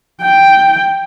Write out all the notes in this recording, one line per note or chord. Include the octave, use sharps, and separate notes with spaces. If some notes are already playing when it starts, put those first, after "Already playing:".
G5